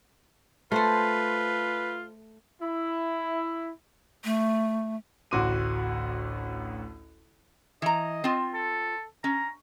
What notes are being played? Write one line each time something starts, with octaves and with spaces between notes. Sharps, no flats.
A3 F4 A4 B4 C5
E4
A3
A1 D2 F#4 C6 D6 D#7
E3 D#5 A#5
C4 F4
A4
C#4 A#5